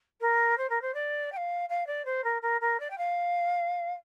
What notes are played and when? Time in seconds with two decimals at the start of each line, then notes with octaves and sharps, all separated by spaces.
0.21 A#4
0.57 C5
0.69 A#4
0.81 C5
0.94 D5
1.32 G5
1.37 F5
1.69 F5
1.87 D5
2.05 C5
2.24 A#4
2.42 A#4
2.61 A#4
2.80 D5
2.90 G5
2.98 F5